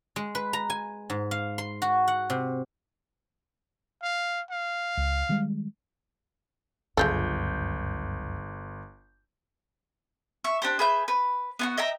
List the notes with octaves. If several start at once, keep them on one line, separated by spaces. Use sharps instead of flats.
G#3
B4
A#5
G#5
G#2
F5
C6
F#4
F#5
C3
F5
F5
C#2
D#3 G3 G#3
G1 C#2 F#2 G#3 F4 A4 G6
E5 C#6
D4 G4 C5
G#4 B4 E5 G6
B4
B3 F4 F#4
D#5 E5 G5 A#5